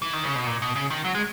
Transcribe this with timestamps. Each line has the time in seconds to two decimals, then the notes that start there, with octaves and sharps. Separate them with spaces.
0.02 E3
0.13 D#3
0.24 C#3
0.36 B2
0.47 A#2
0.62 B2
0.76 C#3
0.90 D#3
1.04 F#3
1.14 G#3